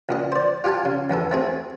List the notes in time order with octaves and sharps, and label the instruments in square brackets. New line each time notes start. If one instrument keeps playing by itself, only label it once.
[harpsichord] C#2 A#2 D#5
C5 D5
F4 G4 F5 G#5 A5
C#3
E2 G#2 B3 A4
A3 C4 G#4